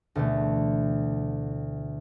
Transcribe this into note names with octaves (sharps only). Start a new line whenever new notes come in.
D2 B2 E3 A3